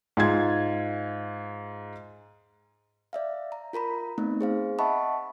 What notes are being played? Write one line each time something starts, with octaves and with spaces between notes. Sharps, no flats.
G#2 F4 G#6
D5 E5 F5
A#5
F4 A#4 A#5 B5
A3 B3 C4 D#4
G#4 C5 F5
D#5 E5 F#5 A5 B5 C#6